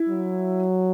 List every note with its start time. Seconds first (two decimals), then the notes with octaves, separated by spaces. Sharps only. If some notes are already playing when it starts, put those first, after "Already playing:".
Already playing: E4
0.09 F#3